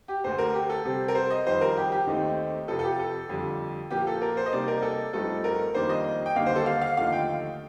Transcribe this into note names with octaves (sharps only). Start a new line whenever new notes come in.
G4
D2 D3 A3 C5
A#4
G4
A4
C3 G3 C4
A#4
C5
D#5
F2 D#3 G3 C5
A#4
G4
G4
D#2 D#3 A3 C4 D#4
F2 C3 F3 A4
A4
G4
A4
F2 D3 G3
A#2 F3 A#3 G4
A4
A#4
C5
D#5
C3 G3 A#3 D#4 D5
A#4
A4
G2 F3 A3 C4 D#4 A4
A#4
F2 D#3 G3 A#3 D4 C5
D#5
G5
D#2 D3 G3 A#3 D#4 F5
C5
A4
F5
F5
D#2 D3 F3 A3 D#4 F5
G5